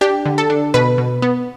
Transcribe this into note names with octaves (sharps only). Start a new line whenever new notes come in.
D4 G4
D3
A4
D4
B2 B4
B2
B3